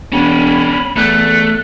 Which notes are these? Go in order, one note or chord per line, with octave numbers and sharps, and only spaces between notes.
E1 C#4 D4 B5
E2 A3 F#6